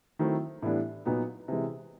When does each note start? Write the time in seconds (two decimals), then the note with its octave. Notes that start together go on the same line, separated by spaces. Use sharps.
0.19 D#3 F#3 A3 C4 E4
0.62 A2 E3 G3 B3 D4
1.05 A#2 F#3 B3 D#4
1.48 C3 E3 G#3